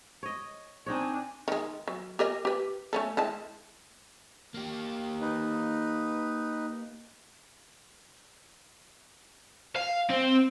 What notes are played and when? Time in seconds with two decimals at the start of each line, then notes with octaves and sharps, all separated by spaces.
0.23 C#5 D#5
0.86 C4 D4 D#4 C#5 G#5
1.48 D#3 G#3
1.88 F#3
2.19 G4 A#4 D#5
2.45 G4 B4
2.93 A3 C#4 A4
3.17 G#3 E4 A5
4.54 A#3 G4
5.21 D#4 B4
9.76 F5
10.10 C4